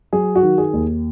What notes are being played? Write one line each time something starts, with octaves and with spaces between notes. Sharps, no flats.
F#3 G#4
F#4
D#3
G#4
D#2